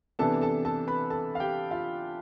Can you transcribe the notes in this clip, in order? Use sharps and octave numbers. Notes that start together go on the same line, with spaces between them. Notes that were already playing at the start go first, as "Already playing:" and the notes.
C3 E3 B3 D4 A4 A5
A4 A5
A4 A5
B4 B5
A4 A5
F5
G4 G5
F4 F5